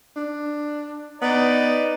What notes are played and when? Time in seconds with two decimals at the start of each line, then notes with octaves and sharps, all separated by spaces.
0.16 D4
1.21 B3 D#4 D5